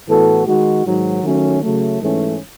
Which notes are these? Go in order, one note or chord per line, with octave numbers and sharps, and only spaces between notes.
A2 E3 B3 F#4 A4
D#3 G#3 D#4 F#4
G#2 D#3 F#3
D#3 F#3 A3 C#4
C#3 F#3 A3
G#2 E3 A3 C#4